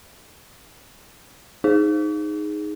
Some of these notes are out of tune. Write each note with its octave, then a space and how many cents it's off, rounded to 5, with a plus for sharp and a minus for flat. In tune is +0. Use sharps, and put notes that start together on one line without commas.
D#4 +0 G#4 +0